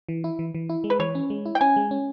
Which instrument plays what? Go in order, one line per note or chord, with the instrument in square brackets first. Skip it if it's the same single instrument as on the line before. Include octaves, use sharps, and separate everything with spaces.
[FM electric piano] E3
E4
E3
E3
E4
G#3
[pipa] B4
[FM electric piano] E3 [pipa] C#5
[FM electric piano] C#4
G#3
E4
[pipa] G5
[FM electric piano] C#4 [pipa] G#5
[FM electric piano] G#3
C#4